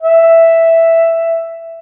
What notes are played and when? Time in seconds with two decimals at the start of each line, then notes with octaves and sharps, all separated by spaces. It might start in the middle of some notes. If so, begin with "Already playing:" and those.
0.01 E5